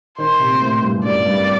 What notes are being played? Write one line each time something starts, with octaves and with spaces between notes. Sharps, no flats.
D#3 C5
C3
A#2
A2
G2
F#2
G2 D5
G2